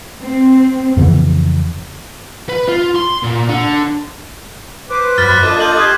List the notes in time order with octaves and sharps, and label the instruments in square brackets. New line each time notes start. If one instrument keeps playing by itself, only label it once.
[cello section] C4
[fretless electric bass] F2 C#3 E3 B3
[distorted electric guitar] B4
F4
C6
A#2
D3
[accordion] B4 C5 D6
[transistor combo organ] F#2 B5 [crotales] F6 F#6 [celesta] A6
[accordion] A#3 D4 F4 [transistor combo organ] A4 D#5 [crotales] D6
[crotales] G6 F#7
[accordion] G4 C6 [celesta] D#6 G#6